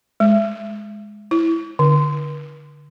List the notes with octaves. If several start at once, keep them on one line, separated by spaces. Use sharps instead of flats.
G#3
E4
D3